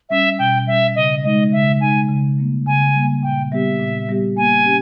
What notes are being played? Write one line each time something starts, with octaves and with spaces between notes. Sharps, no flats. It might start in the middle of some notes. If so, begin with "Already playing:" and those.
G3 C#4 E5
B2 G5
G3 C#4 E5
C#3 D#5
G#3 D#4 D#5
C#3 E5
G#3 D#4 G#5
C#3
G3 A#3
C#3 G#5
G3 A#3
A#2 G5
G3 B3 G4 E5
A#2
G3 B3 G4
A#3 G#5
C#4 G4